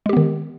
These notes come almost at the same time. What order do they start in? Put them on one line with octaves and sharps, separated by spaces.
G#3 G4 B3 D#3